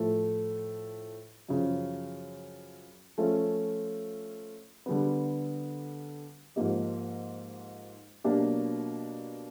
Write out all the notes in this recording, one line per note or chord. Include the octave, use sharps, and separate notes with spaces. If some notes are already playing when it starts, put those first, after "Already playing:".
Already playing: A2 F3 A3
F#2 C#3 F3
F3 A3 C#4 F4
D3 G3 B3
G#2 F3 A#3 D#4 G4
B2 F#3 A#3 D4 G4